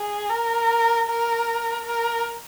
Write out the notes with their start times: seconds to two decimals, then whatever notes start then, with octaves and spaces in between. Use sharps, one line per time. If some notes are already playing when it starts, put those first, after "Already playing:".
Already playing: G#4
0.30 A#4
1.08 A#4
1.86 A#4